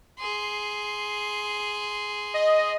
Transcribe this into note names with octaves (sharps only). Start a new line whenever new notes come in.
G#4 C6
D#5